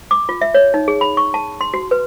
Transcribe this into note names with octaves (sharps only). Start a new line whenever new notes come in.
D6
F4
E5
C#5
D#4
G#4
B5
C#6
A5
C6
F#4
B4